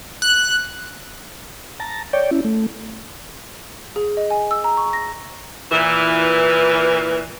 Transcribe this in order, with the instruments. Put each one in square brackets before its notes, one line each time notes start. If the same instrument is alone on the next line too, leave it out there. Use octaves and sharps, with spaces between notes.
[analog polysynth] F#6
[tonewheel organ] A5 A#5
C#5 D5 G5
C#4 E4
A3
[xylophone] G#4
D#5
G#5
E6
A#5
C#6
A#6
[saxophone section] A#2 E3